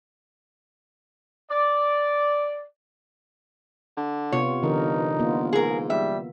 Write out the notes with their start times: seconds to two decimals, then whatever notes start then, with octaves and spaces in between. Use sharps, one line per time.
1.50 D5
3.97 D3
4.32 C3 B3 F4 C#5
4.63 G1 D3 E3 D#4 A#4
5.20 A#3 B3 F4
5.53 G#2 G#4 A#4
5.90 G3 E5